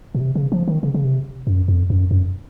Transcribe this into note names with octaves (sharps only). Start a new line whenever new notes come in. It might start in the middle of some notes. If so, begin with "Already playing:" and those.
A#2
C3
C#3
F3
D#3
C#3
C#3
C3
F#2
F2
F#2
F#2